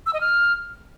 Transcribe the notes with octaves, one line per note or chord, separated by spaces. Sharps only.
E6
D#5
F6